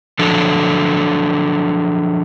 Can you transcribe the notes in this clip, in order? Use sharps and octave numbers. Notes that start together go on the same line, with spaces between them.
F3 F#3 D4 A4